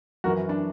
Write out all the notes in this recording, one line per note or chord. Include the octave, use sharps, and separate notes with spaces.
F#2 E3 F#4 A#4
D4